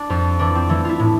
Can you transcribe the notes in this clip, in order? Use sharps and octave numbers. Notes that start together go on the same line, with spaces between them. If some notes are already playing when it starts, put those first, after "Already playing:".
Already playing: D4
F2 F4
E3 D4
C4
E3 A3
E4 F4
A2